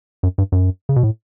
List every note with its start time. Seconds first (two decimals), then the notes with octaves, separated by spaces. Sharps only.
0.23 F#2
0.38 G2
0.52 F#2
0.89 C#3
0.96 B2
1.03 A2